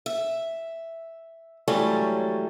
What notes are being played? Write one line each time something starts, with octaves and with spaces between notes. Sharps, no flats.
E5
G#2 E3 F#3 G3 A3 C#4